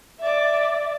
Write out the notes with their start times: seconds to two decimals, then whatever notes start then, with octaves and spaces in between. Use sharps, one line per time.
0.20 D5 E5